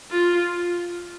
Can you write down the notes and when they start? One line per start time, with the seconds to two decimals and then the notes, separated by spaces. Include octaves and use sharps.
0.11 F4